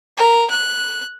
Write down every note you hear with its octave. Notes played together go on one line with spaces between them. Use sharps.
A#4
F#6